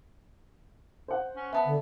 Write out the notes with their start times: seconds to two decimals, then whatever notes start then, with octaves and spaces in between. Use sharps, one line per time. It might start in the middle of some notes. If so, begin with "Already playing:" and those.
1.08 C5 F#5
1.36 C#4
1.53 B3 E5 A5
1.65 D3